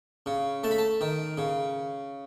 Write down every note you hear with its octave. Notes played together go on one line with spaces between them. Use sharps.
C#3
A3 A5
B5
A5
D#3
C#3